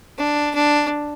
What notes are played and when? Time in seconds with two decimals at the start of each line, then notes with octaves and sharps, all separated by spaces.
0.18 D4
0.55 D4